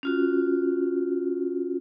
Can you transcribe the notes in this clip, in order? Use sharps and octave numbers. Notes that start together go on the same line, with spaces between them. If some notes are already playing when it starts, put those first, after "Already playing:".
C#4 F4 F#4